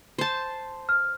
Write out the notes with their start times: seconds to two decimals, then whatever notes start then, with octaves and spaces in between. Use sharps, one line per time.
0.19 C5 A5
0.89 F6